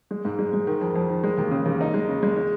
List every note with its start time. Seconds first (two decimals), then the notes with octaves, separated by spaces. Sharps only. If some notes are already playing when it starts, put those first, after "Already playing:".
0.11 G#3
0.25 G#2
0.39 G#3
0.53 G#3
0.67 D#3
0.81 F2
0.95 F2
1.09 D#3
1.24 G#3
1.38 D#2
1.51 C#3
1.66 D#2
1.81 D#4
1.94 G#3
2.08 C#3
2.23 G#3
2.37 G#3